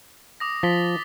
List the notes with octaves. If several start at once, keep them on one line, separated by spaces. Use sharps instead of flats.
D6 D#6 A#6
F3 A6 B6 G7